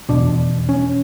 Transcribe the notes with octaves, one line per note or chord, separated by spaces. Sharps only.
F1 E2 B2 D4
C#4